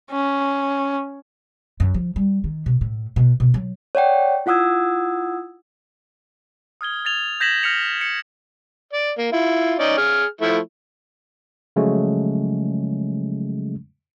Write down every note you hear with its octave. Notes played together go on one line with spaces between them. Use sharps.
C#4
F#2
F3
G3
D#3
B2
A2
B2
B2
F#3
C#5 D5 F#5 G5
E4 F4 F#5 D#6 E6 G#6
D#6 F6 G#6 G7
G#6 A6 F7 G7
G6 G#6 A#6 B6 E7 F#7
F6 A#6 B6 C#7 F7
C#7
D5
A#3
E4 F4
C#4 D#4 D5
G#4 F6
F3 A3 E4
C#3 F3 F#3 G#3 A3 C#4